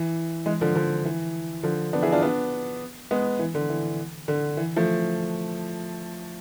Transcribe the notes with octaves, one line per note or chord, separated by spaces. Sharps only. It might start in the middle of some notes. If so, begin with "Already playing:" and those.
Already playing: E3
E3 G#3
D3 F3
D3 F3
E3
D3 F3
B3 D4
E4 G#4
D4 F4
B3 D4
G#3 B3
E3
D3
E3
D3
E3
F3 A3